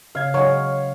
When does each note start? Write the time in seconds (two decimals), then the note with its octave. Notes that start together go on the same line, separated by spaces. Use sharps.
0.15 C#3 F5 G#6
0.34 F#3 G#3 C#5